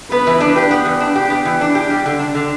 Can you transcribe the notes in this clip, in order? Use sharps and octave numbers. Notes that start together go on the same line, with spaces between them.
B3 B4
E3
D4
G4
B3
E3
D4
G4
B3
E3
D4
G4
G3
D3
D4
D3